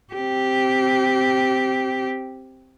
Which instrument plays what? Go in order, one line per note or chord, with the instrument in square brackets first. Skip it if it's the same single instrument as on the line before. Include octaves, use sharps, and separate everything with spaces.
[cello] C4 G4